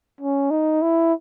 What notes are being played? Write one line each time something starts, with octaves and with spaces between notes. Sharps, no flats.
C#4
D#4
E4